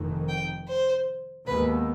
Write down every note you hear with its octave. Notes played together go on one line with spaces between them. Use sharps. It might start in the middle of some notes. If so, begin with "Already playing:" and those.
Already playing: F1 F2 D#3
G5
C5
D#2 D#3 G#3 B3 B4